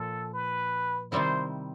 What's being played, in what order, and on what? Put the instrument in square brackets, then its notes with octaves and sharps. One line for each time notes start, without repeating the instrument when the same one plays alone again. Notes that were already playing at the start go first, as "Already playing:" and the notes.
Already playing: [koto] A#2 F3 [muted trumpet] A4
[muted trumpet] B4
[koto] C3 D#3 G3 C4 E4 [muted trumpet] C5